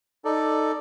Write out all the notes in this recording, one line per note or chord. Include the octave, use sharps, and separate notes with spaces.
D#4 A4 D5